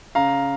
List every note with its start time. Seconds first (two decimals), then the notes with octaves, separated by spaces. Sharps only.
0.15 C#3 F5 A#5